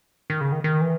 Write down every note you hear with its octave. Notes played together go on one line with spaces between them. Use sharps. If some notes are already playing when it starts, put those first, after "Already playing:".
D#3
C#3
D#3
D#3
E3